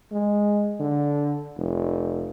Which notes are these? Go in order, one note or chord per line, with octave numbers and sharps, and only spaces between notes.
G#3
D3
F1